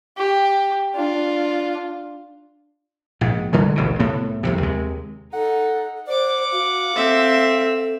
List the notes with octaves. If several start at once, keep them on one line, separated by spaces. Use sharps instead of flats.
G4
D4 F4
A#1 G#2
D3 G3 G#3
E1 A1 D2 C#3
C2 A2 B3
C2 F2 C3
D#2 C3 G#3
D#4 A4 F#5
C5 D5 F#5 D6
F#4 F5
C4 A4 E5